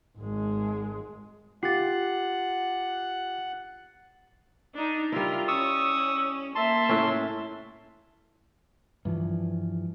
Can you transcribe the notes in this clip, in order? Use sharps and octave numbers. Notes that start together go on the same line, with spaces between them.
G#1 G#3
F4 G4 F#5 A6 C7
D4 D#4
G3 E4 F4 A#4
C#4 C#6 D#6 E6
A#3 E5 A5 C6
A2 C#4
G2 E3 F3